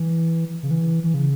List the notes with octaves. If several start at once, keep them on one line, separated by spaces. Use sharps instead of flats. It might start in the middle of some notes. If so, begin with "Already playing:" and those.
Already playing: E3
C#3
E3
E3
C#3